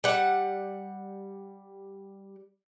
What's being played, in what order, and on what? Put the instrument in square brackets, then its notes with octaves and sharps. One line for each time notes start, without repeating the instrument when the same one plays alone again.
[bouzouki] G3 F#5